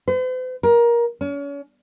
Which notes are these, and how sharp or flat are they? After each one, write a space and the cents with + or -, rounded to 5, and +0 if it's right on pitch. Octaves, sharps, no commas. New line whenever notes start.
C5 -45
A#4 +20
C#4 +35